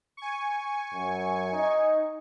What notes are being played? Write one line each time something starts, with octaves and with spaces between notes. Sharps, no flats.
G#5 C#6
F#2
D#4